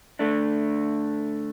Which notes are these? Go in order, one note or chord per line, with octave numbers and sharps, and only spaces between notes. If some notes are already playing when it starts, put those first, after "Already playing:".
D3 A3 D4